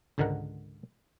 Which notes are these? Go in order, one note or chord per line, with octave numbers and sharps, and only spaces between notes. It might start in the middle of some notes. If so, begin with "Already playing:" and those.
C#2 G#2 D3 D#3 A#4 F#5